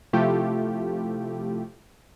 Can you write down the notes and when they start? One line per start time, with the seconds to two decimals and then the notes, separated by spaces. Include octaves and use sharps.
0.13 C3 F3 A3 E4 F4 G4